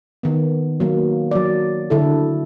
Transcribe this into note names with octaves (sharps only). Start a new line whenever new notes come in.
D#3 B3
F#3 A#3
F#3 D5
D3 E4 A4